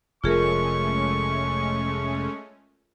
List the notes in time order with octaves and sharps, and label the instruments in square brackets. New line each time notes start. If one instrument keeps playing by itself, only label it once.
[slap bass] F1 [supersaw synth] G#3 A3 C#4 [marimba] F4 G#4 A#4 [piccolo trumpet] C#6